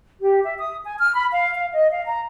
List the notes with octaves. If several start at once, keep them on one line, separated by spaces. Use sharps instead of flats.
G4
E5
D#6
G#5
F6
B5
F5
F5
D#5
F5
A#5